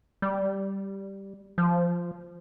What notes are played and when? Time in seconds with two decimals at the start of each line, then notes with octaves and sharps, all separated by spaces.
0.22 G3
1.58 F3